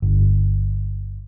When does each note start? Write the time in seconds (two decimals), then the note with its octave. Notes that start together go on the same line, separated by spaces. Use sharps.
0.02 G1